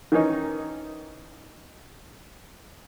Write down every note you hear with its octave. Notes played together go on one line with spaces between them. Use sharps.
D#3 E3 C#4 D#4